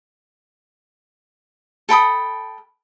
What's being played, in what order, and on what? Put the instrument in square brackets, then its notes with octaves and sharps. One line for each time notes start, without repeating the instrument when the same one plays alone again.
[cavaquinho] A4 G5 B5 D#6